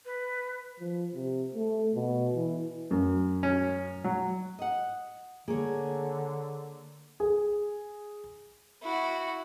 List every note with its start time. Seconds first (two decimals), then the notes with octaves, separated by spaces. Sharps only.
0.05 B4
0.79 F3
1.15 C3
1.55 A3
1.95 B2
2.35 E3
2.91 F#2
3.43 C#4
4.04 F#3
4.59 D#5 F#5
5.48 D3 A#3 G#4 C#5
7.20 G#4
8.82 E4 F#4